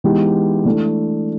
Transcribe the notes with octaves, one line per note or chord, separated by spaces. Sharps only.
E3 G#3 B3 D#4 G4
E3 A3 D4